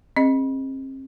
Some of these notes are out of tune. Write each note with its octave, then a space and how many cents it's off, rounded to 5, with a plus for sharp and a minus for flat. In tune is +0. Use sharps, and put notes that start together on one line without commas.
C4 +40 G#4 +0 D#5 +0